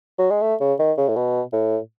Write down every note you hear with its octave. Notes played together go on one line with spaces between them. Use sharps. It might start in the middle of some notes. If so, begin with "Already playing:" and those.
F#3
G#3
A3
C#3
D#3
C#3
A2
B2
A2